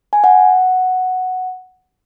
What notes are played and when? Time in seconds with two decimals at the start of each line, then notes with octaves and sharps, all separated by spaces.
0.13 G#5
0.24 F#5